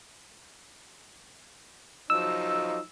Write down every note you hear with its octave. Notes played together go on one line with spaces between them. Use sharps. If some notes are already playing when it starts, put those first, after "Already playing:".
F3 F#3 D#4 E6